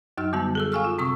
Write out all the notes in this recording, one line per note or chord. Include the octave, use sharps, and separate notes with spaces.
F#2 F#3 D#4 F#4 F6
D3 G3 B3 F#4 A5
G#4 A4 E6
F5 G5 G#5 C#6 E6 F6
F4
C3 C4 C#6 D#6 E6